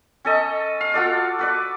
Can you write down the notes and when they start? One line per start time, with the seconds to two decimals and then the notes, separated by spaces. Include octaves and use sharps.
0.25 C#4 A4 D#5
0.81 F5
0.94 F4 F#4 A4 D5
1.39 F#4 B4 D5